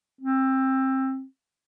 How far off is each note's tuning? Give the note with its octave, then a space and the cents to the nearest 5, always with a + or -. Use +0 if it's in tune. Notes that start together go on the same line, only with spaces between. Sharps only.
C4 +20